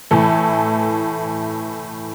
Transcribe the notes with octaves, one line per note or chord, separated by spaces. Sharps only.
A2 E3 A3 E4 A4